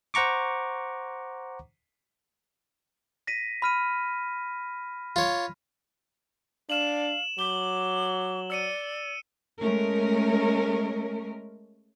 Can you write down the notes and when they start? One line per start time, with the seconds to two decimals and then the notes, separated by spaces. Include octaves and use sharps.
0.14 C5 F#5 A#5 C#6 D6
3.27 A#6 B6 D#7
3.62 B5 F6 D#7
5.16 F4 C#5
6.70 D4 F5 E7 F#7
7.39 F#3 D6 G7
8.50 D5 E6 C#7 D#7
9.61 G#3 A3 C#4 A#4